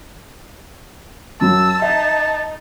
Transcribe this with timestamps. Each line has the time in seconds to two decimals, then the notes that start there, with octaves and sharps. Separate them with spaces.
1.41 F#2 F#3 A5 E6
1.82 D#4 E5